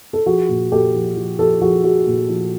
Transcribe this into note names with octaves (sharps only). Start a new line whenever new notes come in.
A4
F3 F#4 G#4
A#2
A#2 G4 A4
F3
F3
F3 G4 A4
F3 F#4 G#4
F3 F#4 G#4
A#2
F3